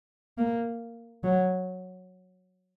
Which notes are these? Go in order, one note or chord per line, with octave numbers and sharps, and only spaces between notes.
A#3
F#3